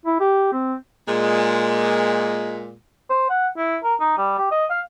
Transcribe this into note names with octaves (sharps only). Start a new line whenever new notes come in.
E4
G4
C4
A#2 G#3
C5
F#5
E4
A#4
D#4
G3
G4
D#5
F5